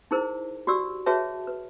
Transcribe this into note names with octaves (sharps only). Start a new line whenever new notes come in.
D#4 E4 G#4 A#4 C5
F#4 G4 D5 E6
F#4 G#4 B4 C#5 E5 A5
B4